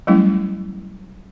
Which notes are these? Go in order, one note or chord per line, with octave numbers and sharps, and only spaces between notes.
F#3 G3 A3 C#4 E4